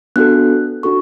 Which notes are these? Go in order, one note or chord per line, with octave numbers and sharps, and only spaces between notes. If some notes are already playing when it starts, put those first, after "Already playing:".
B3 D4 F#4 A4 F#6
D4 F#4 A4 C#6